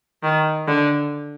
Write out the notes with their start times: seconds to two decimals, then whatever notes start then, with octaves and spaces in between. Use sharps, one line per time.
0.23 D#3
0.67 D3